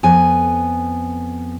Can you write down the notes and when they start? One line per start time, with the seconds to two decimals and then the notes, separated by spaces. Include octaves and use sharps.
0.03 F2 B3 G#5